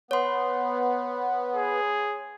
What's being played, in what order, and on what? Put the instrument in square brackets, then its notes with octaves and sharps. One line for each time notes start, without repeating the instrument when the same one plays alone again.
[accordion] B3 [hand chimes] C#5 C6
[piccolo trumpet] G#4